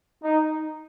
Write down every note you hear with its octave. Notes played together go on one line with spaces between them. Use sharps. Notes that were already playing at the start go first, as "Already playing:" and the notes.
D#4